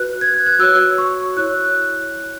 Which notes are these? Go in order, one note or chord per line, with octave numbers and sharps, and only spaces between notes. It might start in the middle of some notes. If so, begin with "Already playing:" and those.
Already playing: F#4 B4 F#6
G#6
F#6
F#6
F#4 C#5 E6
C#6
E4 C#5 F#6